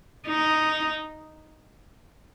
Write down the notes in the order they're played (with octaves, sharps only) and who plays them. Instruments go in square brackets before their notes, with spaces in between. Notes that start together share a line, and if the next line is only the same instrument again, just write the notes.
[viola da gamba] D#4